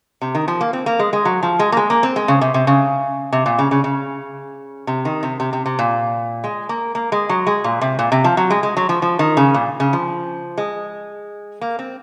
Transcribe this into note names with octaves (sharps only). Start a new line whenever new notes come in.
C3
D#3
F3
A#3
C4
A#3
G#3
G#3
F#3
F3
G#3
A#3
G#3
A#3
C4
G#3
C#3
C3
C3
C#3
C3
A#2
C#3
C#3
C#3
C3
D#3
C3
C3
C3
C3
A#2
G#3
A#3
A#3
G#3
F#3
G#3
A#2
C3
A#2
C3
F3
F#3
G#3
G#3
F#3
F3
F3
D#3
C#3
A#2
C#3
F3
G#3
A#3
C4